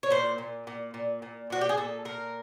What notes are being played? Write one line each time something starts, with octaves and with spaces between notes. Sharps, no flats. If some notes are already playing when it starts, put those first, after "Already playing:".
C#5
A#2 C5
A#2
A#2
A#2
A#2
A#2 F#4
G4
G#4
A#2 A4
A#2 A#4